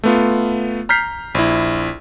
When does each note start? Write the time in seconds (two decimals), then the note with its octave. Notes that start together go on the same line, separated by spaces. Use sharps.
0.03 A3 B3 F4
0.89 A#5 F6 G6 B6 C7
1.35 A#1 E4